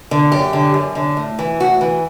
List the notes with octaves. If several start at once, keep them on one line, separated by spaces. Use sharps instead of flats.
D3
F#2 G4
D3
F#2
D3
A2
E3
A2 F#4
E3